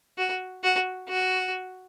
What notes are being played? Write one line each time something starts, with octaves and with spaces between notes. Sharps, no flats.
F#4
F#4
F#4